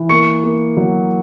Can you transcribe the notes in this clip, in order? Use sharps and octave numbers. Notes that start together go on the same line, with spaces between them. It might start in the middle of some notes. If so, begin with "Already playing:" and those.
Already playing: E3
A#3 C#6 C#7
A#3
F#3